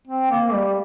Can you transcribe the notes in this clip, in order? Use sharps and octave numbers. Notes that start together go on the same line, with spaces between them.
C4
A#3
G3